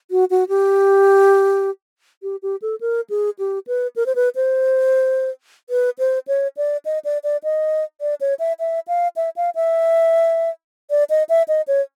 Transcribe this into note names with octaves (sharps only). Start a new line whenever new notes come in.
F#4
F#4
G4
G4
G4
A4
A#4
G#4
G4
B4
A#4
C5
B4
C5
B4
C5
C#5
D5
D#5
D5
D5
D#5
D5
C#5
E5
E5
F5
E5
F5
E5
D5
D#5
E5
D#5
C#5